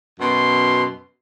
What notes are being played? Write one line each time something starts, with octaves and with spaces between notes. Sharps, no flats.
F#2 B2 C6